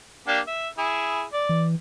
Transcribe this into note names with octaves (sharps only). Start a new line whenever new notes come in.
A#3 D4 G4
E5
E4 G#4
D5
E3